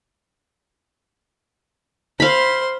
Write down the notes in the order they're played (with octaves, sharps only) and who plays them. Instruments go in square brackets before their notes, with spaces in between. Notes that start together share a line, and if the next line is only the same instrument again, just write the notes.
[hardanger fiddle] C5 C6 [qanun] F5 B5